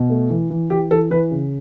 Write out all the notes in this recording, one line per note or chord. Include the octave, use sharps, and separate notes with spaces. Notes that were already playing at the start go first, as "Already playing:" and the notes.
Already playing: B2
A3
E3
E3
E3 G4
E3 A4
E3 B4
C#3